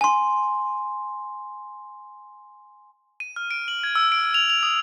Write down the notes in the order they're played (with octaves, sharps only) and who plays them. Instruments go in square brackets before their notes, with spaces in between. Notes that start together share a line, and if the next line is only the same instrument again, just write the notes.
[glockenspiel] G#5 C6
[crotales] D#7
F6
D7
F#7
G#6
E6
D7
F7
F7
D#6